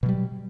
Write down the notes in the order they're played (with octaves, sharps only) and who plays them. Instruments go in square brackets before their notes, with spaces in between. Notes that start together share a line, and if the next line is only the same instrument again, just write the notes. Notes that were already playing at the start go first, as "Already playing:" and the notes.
[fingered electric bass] B2
F#3
G3